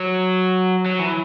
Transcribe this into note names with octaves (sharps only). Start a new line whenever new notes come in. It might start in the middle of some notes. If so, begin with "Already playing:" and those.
Already playing: F#3
F#3
E3